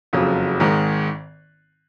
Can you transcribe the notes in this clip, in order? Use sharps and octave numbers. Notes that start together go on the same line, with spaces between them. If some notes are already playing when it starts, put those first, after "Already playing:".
F#1 F2 C#3 F#3
G#1 G#2 D#3 G#3